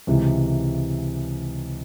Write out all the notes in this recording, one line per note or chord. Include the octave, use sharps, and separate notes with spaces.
C#2 C3 E3